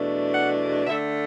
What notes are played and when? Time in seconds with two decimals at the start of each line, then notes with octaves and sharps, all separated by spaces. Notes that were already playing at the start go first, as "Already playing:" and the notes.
Already playing: E2 B2 A3 D4
0.32 F#5
0.87 D3 A3 D4 E5